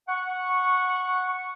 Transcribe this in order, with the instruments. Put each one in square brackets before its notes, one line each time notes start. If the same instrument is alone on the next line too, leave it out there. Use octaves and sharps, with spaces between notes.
[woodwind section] F#5 C#6